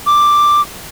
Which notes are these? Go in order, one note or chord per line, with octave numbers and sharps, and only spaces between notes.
D6